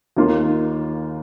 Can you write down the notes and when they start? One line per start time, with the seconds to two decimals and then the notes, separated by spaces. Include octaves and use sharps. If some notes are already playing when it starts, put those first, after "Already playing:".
0.17 D#2 D#3 A#3 F4